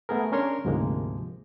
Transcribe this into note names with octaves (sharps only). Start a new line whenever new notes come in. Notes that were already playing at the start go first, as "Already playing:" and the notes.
A3 B3 G#4 A#4
C#4 D4 A#4 C#5 C6
D2 G#2 C3 F3 G#3 A#3